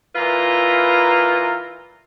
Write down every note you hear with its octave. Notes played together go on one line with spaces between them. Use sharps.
A#2 E3 F4 B4 E5 A#5